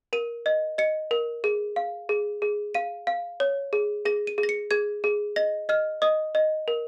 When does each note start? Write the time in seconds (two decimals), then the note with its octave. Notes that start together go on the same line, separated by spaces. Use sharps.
0.13 A#4 D#7
0.46 D#5
0.78 D#5 C#7
1.11 A#4
1.44 G#4
1.76 F5
2.09 G#4
2.42 G#4
2.75 F5 D#7
3.07 F5
3.40 C#5
3.73 G#4
4.05 G#4 A#6
4.27 D#7
4.38 G#4
4.43 A#6
4.49 C#7
4.71 G#4 G#6
5.04 G#4
5.36 D#5 A#6
5.69 D#5 F6
6.02 D#5 D#6
6.35 D#5
6.68 A#4